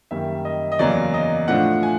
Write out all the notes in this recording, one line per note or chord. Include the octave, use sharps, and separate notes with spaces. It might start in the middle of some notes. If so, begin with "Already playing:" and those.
F#2 D#3 G3 A#3 E5
D#5
D#5
E2 C#3 F#3 A#3 D5
D#5
A2 F3 A3 D4 F4 F#5
G#5